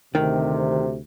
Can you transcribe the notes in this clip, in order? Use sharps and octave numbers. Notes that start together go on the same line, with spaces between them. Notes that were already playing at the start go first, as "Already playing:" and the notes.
D2 C3 D#3